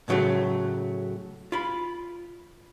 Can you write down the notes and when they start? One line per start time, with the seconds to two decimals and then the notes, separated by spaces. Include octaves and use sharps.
0.08 A2 C#3 F#3 G#3 A3
1.52 F4 B5